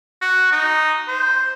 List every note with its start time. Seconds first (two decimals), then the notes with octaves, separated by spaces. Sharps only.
0.21 F#4
0.52 D#4
1.08 C5